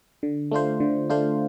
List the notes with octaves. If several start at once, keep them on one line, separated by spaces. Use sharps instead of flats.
D3
A3 D4 F4 C5
D3
A3 D4 F4 C5